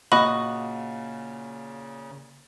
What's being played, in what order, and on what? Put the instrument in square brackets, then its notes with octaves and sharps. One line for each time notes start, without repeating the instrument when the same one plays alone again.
[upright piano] A#2 [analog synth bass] C#3 [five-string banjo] F#4 D#5 [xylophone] B5